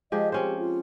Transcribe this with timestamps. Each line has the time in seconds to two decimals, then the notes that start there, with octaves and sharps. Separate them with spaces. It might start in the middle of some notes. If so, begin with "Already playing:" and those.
0.12 F3 G#3 G4 D#5
0.32 C4 C#4 G4 C5
0.59 F4